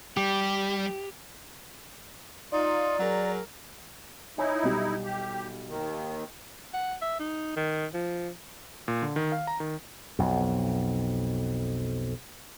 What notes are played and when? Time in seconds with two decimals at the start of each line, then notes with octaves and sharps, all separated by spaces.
0.17 G3 G4
2.52 D#4 F4 D5
2.99 F#3 G#4 A#4
4.38 D#4 E4 C#5 G#5 B5
4.63 B1 G3
5.04 G4
5.69 D#2 D#3
6.74 F#5
7.02 E5
7.20 D#4
7.56 D#3
7.94 F3
8.88 A#2
9.02 D3
9.16 D#3
9.32 F5
9.47 A#5
9.60 D#3
10.19 B1 F2